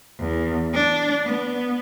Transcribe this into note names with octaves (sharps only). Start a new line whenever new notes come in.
E2
D4
B3